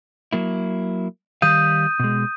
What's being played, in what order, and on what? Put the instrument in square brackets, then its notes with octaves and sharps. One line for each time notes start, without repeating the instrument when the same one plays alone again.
[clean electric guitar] F#3 A#3 E4
[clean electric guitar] D#3 G3 F5 [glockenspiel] D#6 G6 D#7
[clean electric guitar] B2 G#3